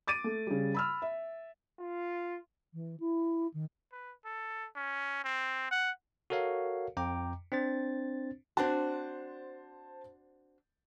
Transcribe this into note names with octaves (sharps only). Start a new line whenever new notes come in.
D6 A6 D7 D#7
A3
C#3 G3
B5 E6 F6
E5
F4
E3
E4
D#3
B4
A4
C#4
C4
F#5
F#4 A4 A#4 C#5 F5
F2 G5 A#5 D6
C4 D4 C5 A6
C4 D4 F#4 C5 A5